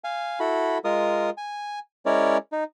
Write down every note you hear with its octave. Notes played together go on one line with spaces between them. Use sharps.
F5 G#5
E4 F#4 A4 B5
G#3 F4 A#4 D#6
G#5
G#3 C#4 E4 A#4 C#5 D5
D#4